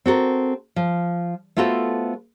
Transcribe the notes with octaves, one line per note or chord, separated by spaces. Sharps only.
C4 F#4 A4 A#4
F3
A3 B3 F4 F#4 A4 C5